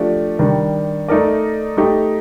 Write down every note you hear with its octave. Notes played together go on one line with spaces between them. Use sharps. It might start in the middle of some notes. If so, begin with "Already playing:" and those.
Already playing: F3 A3 D4 G4
D#3 G3 D4
A3 D#4 A#4 D5
A3 D#4 G4